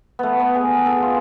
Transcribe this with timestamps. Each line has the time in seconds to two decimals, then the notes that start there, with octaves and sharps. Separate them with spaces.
0.19 A3 B3
0.40 B3
0.55 G#4
0.86 A4
0.96 G#4
1.02 F4